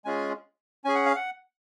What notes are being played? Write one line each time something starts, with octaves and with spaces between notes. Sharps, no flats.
G#3 C#4 F4 G#4 G#5
C#4 G#4 G#5
F#5
F5
F#5